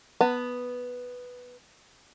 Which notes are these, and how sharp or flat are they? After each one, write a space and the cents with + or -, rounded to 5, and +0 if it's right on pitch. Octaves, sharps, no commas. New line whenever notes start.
B3 +0 A5 +40